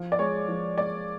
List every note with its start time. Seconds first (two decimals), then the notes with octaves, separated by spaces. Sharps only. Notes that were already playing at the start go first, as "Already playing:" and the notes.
Already playing: F3
0.12 D5
0.19 G#3 C#5
0.48 F3
0.78 G#3 D5